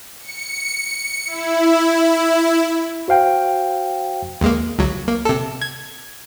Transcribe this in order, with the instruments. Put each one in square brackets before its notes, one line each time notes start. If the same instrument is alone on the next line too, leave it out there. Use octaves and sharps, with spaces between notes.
[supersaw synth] C#7
E4
[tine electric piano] F#4 C5 F5 G5
[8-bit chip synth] D#2 G#3 A#3
C#2 F#3
A#3
C3 A4
G#6